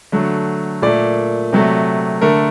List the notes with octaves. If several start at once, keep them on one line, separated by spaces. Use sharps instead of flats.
D3 F#3 A3
A#2 A3 D5
C3 F#3 A3
D3 A3 A#4